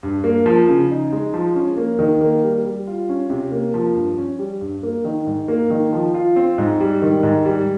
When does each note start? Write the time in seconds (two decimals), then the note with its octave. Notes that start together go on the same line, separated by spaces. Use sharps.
0.03 G2
0.24 A#3
0.46 F3
0.69 C#3
0.90 D#4
1.12 G#3
1.34 F3
1.55 C#4
1.77 A#3
1.99 D#3
2.21 A#3
2.44 G3
2.65 G3
2.87 F4
3.09 C#4
3.30 C3
3.52 A#3
3.74 F3
3.95 G2
4.18 C#4
4.39 G3
4.61 G2
4.83 A#3
5.04 D#3
5.27 G#2
5.48 A#3
5.70 D#3
5.93 F3
6.14 F4
6.36 C4
6.58 G#2
6.80 G3
7.02 D#3
7.23 G#2
7.45 G3